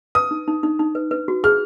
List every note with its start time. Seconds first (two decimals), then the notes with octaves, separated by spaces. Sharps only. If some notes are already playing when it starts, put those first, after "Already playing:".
0.15 B4 D#6
0.31 D#4
0.48 D#4
0.63 D#4
0.79 D#4
0.95 B4
1.11 B4
1.28 F#4
1.44 G#4 F6